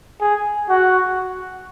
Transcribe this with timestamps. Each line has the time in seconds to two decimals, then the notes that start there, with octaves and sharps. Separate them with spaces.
0.21 G#4
0.69 F#4